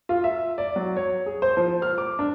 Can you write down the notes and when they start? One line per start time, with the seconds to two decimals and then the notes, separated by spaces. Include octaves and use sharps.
0.09 F4
0.24 E5
0.58 D5
0.76 F#3
0.97 C#5
1.26 G#4
1.42 C5
1.57 F3
1.82 F6
1.98 D6
2.19 D4